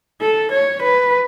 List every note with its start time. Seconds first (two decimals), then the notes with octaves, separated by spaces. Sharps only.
0.21 A4
0.52 C#5
0.83 B4